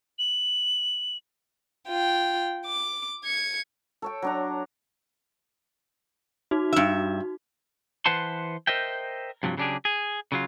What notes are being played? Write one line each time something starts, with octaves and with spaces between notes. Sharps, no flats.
F#7
F4 G5
D6
G#6 C#7
A4 C#5 G5
F#3 D4 A#5
D#4 F#4
G2 E5
E3 B4 C5 F#5 A5 C6
A#4 C5 D#5 E5 G5
G2 C3 F3 F#3
C#3 F#3 D4 G4 G#4
G#4
C#3 F#3 F4